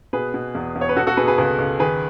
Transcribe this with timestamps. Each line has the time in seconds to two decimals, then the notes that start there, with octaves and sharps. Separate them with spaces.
0.13 B2 G#4 B4
0.34 B2
0.55 E2
0.75 E2
0.81 C#5
0.89 B4
0.96 B2 F#4 A4
1.07 F#4 A4
1.17 B2 G#4 B4
1.27 G#4 B4
1.38 C#2 G#4 B4
1.59 C#2
1.80 D#3 G#4 B4